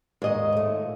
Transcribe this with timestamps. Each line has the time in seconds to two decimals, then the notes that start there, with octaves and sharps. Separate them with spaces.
0.22 D#2 G#2 D#3 D#5
0.52 A#2 A3